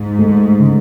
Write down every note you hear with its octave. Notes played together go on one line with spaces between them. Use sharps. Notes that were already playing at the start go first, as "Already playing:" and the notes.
Already playing: G#2
A3
C#3